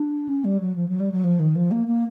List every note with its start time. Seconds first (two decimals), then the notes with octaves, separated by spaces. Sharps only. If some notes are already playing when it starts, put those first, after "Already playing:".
Already playing: D4
0.29 C#4
0.44 G3
0.60 F#3
0.76 F3
0.89 F#3
1.00 G3
1.12 F#3
1.24 F3
1.39 D#3
1.55 F3
1.71 A#3
1.87 A#3